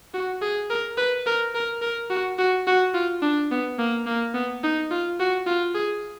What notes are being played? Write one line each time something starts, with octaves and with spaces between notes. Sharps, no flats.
F#4
G#4
A#4
B4
A#4
A#4
A#4
F#4
F#4
F#4
F4
D4
B3
A#3
A#3
B3
D#4
F4
F#4
F4
G#4